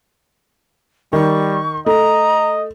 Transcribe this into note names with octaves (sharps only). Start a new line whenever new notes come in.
D#3 G3 C#6
A3 D#5 A#5